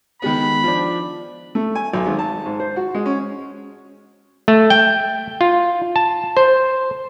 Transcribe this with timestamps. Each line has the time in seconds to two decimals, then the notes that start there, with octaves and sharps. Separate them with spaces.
0.22 D#3 G#3 B3 B5
0.64 F3 D4
1.55 A3
1.75 G#5
1.93 B1
2.06 G#1
2.19 A5
2.46 G#2
2.60 C5
2.76 F#4
2.94 G#3
3.06 C#4
4.48 A3
4.70 G5
5.41 F4
5.96 A5
6.37 C5